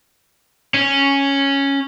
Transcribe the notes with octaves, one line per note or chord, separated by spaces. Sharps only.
C#4